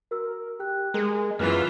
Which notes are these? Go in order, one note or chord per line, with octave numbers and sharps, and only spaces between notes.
F#4 A#4 E6
G4 G5 F#6
G#3 G#4 A#4
F#2 E3 F4 F6